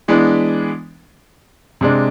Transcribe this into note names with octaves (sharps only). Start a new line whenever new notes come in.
E3 G#3 B3 D4
C3 G#3 D4